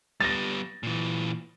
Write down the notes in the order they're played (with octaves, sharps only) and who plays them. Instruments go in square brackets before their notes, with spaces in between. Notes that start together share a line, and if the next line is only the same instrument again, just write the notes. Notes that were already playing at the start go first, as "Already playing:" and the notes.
[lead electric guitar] G3 B3 [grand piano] A6 A#6
[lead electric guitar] A#2 E3